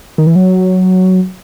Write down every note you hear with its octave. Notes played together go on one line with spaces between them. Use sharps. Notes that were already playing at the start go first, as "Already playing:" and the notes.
D#3
E3
F#3